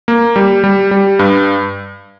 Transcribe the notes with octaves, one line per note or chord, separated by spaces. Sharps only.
A#3
G3
G3
G3
G2